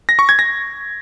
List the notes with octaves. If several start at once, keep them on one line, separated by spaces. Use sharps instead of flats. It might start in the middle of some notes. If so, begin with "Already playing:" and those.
A#6
C#6
G#6
A#6